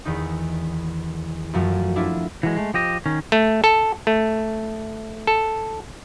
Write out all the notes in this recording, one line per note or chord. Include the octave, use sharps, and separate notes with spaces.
E2 D#3 D#4
F#2 F3 F#3 A3
D4 E4 F4
E3 F#3 G#3
G#3 A3
F3 G4 D#5
D#3 C#4
A3
A4
A3
A4